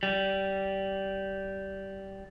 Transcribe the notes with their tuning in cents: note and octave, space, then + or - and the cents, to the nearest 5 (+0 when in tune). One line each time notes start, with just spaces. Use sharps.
G3 -15